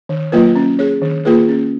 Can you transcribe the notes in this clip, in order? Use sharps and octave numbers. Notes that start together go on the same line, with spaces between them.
D#3
F#3 A#3 F4 B4
C#4
G#4 C#5
D#3
A#3 F4 G#4 B4
C#4